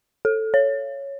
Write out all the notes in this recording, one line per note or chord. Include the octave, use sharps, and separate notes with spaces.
A4
C#5